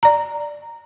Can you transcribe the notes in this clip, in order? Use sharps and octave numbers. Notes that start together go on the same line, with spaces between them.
D5 A#5